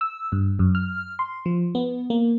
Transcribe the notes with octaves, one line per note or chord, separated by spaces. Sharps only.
E6
G2
F#2
F6
C6
F3
B3
A#3